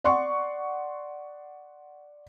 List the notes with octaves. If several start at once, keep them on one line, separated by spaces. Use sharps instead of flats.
D5 F#5 C6 C#6